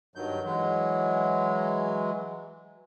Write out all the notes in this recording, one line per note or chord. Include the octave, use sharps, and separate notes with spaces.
G2 D#3 F#3 G6
E3 F#3 G#3